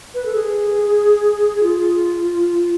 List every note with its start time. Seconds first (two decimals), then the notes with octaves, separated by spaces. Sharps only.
0.14 B4
0.25 A4
0.35 G#4
1.63 F4